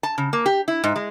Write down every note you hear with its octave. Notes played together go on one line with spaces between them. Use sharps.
A5
C#3
A#3
G4
E4
G#2
G#3